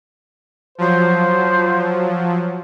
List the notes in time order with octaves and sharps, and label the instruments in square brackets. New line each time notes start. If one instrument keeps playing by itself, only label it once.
[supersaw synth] F3 F#3 [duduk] C5